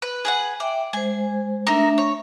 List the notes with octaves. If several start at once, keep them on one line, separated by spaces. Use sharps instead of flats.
B4
G#4 B4 F#5
D5 E5 G5
G#3 C5 G#5
A3 D4 D#4 A4 A#4 E5
C#5